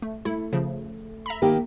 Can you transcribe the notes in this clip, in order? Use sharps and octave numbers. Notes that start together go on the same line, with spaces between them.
A3
A3 E4
C#3 F3
E5 A#5 B5
D#3 A#3 G4